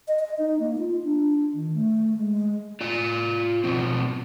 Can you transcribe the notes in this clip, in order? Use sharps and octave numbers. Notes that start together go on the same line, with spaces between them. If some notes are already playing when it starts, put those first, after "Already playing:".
D#5
D#5
D#4
A#3
F4
D4
D#3
A3
G#3
F4 D5
B2 F3 C4